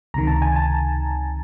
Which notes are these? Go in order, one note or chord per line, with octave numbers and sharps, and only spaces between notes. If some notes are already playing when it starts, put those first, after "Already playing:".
C#2 C3 D#3 A#5
A5
G#5
A5